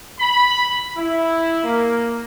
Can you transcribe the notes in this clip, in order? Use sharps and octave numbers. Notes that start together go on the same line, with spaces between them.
B5
E4
A#3